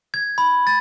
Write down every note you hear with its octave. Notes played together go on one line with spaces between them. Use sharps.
G#6
B5
A6